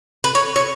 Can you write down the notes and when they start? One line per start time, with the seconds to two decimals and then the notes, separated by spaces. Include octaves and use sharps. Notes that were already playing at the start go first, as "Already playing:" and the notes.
0.24 B4
0.35 C#5
0.56 C#5